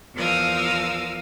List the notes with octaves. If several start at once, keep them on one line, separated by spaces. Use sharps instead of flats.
E2 F3 A#4 F5 D#6 E6